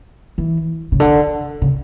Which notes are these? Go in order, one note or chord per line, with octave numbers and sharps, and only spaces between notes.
E3
C#3
D3
C#3